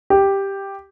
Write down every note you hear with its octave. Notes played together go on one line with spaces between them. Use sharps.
G4